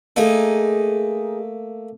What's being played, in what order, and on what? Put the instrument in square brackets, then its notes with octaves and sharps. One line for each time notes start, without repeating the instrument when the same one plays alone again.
[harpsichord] A3 A#3 A4 [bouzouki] D#4 G#4